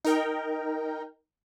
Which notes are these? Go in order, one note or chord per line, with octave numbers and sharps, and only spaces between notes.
D#4 A#4 G5